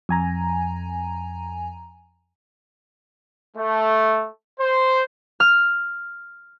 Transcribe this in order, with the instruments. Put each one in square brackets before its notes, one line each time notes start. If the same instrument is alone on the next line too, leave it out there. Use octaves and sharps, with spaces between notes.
[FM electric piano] F2 G#5 A#5
[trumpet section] A3
C5
[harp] F6